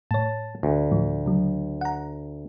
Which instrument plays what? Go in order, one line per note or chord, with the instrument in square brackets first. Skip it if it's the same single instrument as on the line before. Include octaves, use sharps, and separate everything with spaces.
[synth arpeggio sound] A2 C#5 [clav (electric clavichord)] A5
[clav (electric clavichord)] D2
[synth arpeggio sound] A2 F3
C#3 F#3
F#5 A#5